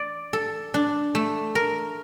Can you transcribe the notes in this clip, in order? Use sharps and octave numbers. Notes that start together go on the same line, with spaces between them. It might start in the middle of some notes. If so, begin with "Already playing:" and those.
Already playing: D5
A4
D4
A3
A#4